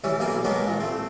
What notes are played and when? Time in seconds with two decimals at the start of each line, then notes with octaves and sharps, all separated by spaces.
0.04 E3 G3 C#4
0.20 B1 B2 G3 A#3 G#5
0.45 G#3 A#3 B3 C#4 D4
0.67 A1 A#2
0.80 A3 C4